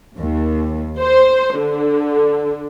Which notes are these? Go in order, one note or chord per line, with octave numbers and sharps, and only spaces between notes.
D#2
C5
D3